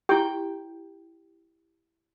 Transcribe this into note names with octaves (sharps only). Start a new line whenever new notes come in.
E4 G4 G5